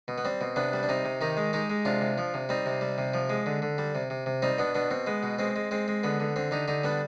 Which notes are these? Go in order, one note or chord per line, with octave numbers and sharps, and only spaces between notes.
B2
B3
G3 C4
B2
C3 B3 D4
G3
D4
C3 C4 D#4
C3
D#3 D#4 G4
G#3
G#3 D#4 G4
G#3
C3 D4 F4
C3
F3
C3
G3 C4 D#4
C3
G3
C3
F3
G#3
D3
D3
G3
C3
C3
C3
G3 C4 D#4
B2 B3 D4
B2 B3 D4
B2 C4
G#3 B3
B2
G#3 C4
G#3
G#3 C4
G#3
D3 B3
D3
D3 C4
D3 D#4 G4
D3 D#4 G4
G3 B3 D4